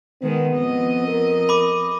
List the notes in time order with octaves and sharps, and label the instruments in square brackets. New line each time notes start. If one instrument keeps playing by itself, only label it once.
[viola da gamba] D#3 G#3 [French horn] B3
[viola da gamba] F2 D#5
[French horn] A#4
[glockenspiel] B5 D6